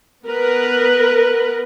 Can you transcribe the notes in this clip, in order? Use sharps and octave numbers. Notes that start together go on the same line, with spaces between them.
B3 A#4 B4